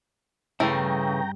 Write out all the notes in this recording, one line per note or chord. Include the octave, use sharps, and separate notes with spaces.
G2 C#3 E3 A3 G5 A#5